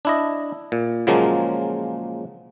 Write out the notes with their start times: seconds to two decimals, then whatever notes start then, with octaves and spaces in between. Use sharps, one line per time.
0.05 D4 E4 D#5
0.72 A#2
1.07 A#2 C#3 F3 F#3 G#3 A#3